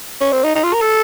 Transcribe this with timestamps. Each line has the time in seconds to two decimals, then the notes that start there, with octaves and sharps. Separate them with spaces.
0.21 C#4
0.32 C4
0.44 D#4
0.55 D#4
0.64 F4
0.73 A#4
0.81 A4